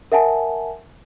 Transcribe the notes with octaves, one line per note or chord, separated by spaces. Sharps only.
A#4 E5 F#5 G#5 A5